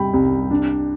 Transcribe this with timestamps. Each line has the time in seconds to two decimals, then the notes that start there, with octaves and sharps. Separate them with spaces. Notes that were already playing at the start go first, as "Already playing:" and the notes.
Already playing: C3 G3 G5 B5
0.14 C2
0.51 D4